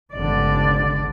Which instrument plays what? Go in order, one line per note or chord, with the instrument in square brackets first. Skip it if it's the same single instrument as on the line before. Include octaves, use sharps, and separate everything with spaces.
[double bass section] G1 C#2 D3 [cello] D5